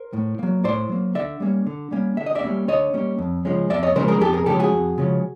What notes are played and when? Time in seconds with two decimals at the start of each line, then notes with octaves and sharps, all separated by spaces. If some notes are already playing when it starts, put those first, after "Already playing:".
Already playing: A#4 C5
0.13 A2
0.39 F#3 A#3
0.64 A2 C5 D5
0.89 F#3 A#3
1.15 D3 D5 E5
1.40 G3 A#3 C#4
1.67 D3
1.91 G3 A#3 C#4
2.17 D3 E5
2.26 D#5
2.35 D5 E5
2.43 G3 A#3 C#4
2.68 D3 C#5 D#5
2.94 G3 A#3 C#4
3.19 F2
3.45 C#3 F3 G#3 C#4
3.70 F2 D5 E5
3.83 C#5 D#5
3.95 C#3 F3 G#3 C#4 A#4 C5
4.08 G#4 A#4
4.21 F2 G4 A4
4.33 G#4 A#4
4.46 C#3 F3 G#3 C#4 G4 A4
4.59 F#4 G#4
4.72 F2
4.98 C#3 F3 G#3 C#4